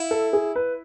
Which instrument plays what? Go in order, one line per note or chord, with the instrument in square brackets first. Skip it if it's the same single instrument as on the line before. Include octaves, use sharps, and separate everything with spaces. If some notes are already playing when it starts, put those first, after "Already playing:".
Already playing: [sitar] E4
[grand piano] A4
G#4
B4